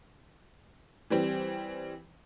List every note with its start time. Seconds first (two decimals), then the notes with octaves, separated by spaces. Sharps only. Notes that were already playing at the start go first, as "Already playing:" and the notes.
1.10 E3 G3 C4